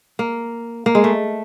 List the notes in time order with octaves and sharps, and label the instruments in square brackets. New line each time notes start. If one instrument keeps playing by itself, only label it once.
[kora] A#3
A#3
G#3
A3